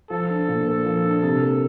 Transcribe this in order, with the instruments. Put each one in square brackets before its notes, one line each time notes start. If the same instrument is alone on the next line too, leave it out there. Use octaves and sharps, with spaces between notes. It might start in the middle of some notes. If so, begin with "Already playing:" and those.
[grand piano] F3 [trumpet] A4
[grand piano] D4
A#2
A#3
F3
D4
C3
A#3